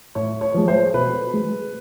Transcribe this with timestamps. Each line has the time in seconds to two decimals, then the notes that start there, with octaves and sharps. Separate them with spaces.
0.15 A2 C#5
0.41 C#5
0.54 F3 G#3
0.68 C5
0.94 B2 B4
1.34 G#3